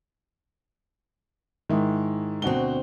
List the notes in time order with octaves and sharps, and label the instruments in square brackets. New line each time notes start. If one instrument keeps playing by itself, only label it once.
[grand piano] G#2 D#3 [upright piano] G#3 E4
[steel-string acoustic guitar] D2 C4 [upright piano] B2 F#4 G7